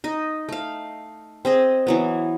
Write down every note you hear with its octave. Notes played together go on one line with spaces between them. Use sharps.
D#4 D#5
A3 F5
C4 G#4 D#5
E3 F#3 B3